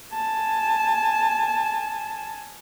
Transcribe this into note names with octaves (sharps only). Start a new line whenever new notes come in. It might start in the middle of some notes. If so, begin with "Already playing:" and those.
G#5 A5